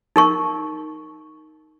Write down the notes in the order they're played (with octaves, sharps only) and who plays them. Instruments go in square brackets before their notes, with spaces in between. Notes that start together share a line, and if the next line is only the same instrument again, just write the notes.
[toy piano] D#4 A#4 C#6